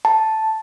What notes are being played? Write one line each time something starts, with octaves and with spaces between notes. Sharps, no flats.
A5